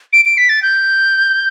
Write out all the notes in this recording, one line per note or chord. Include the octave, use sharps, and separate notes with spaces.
D7
D7
B6
A6
G6